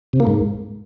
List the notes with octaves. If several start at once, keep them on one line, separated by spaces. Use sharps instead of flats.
C3
A#3
G#2